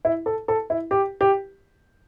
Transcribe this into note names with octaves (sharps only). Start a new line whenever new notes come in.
E4
A4
A4
E4
G4
G4